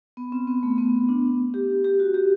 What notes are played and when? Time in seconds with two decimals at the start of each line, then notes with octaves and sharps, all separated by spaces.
0.17 B3
0.32 C4
0.47 B3
0.63 A3
0.78 B3
1.09 D4
1.54 G4
1.84 G4
2.00 F#4
2.14 G4